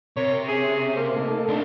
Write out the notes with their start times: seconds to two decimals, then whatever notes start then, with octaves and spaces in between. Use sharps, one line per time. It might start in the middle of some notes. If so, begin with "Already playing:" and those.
0.17 C3 A#4 C#5
0.48 C#4 G#4
0.62 C#4
0.96 A#3 C5
1.16 A3 D#4 A4
1.48 C2 D4